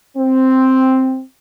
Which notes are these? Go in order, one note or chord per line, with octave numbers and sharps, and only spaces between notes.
C4